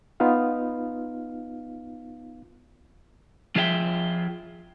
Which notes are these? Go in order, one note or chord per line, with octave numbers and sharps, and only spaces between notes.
B3 D#4 F4 F5
F3 F4 G#4 E5 F5 G5